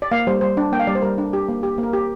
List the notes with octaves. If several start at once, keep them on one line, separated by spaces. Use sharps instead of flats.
D5
A#3 F5
G3 C5
G3 C5
D4
A#3 G5
F5
G3 D5
C5
G3 A#4
D4
G4
A#3
G4
A#3
A#4
G4